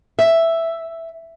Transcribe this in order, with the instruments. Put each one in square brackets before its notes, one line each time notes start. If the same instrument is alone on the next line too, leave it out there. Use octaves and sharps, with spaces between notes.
[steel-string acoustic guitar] E5